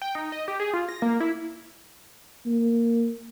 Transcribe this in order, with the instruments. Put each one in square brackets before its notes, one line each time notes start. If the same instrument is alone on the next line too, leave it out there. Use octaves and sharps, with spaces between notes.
[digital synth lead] G5
D#4
D#5
G4
G#4
F4
A#6
A#3
E4
[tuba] A#3